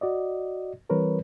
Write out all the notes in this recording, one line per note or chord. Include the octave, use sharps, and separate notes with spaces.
F#4 D5 D#5
E3 G3 C4 A#4 B4 C#5